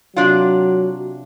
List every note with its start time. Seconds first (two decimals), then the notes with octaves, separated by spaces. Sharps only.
0.17 C3 F#3 D4 F4